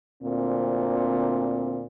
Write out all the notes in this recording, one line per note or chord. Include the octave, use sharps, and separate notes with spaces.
D2 A#2 C4